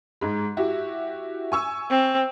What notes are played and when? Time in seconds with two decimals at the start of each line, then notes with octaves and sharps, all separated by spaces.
0.21 G#2 G#3
0.57 E4 F#4 G4
1.52 G#5 C#6 E6
1.90 C4